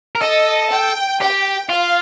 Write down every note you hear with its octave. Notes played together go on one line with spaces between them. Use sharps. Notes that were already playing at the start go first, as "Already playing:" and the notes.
A#4
A4 D#5
G5
G4 G5
F4 F5